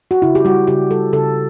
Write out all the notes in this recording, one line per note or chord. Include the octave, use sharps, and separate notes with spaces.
F#4
C#3 E4
G4
G3 F#4
C#3 G4
G3 A4
C#3 A4